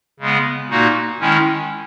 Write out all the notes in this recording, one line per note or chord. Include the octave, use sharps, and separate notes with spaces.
C#3 G#3 B3
A#2 A#3 D#4 F#4
D#3 G#3 C#4 E4